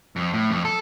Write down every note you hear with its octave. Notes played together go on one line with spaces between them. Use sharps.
F2
A2
F2
A4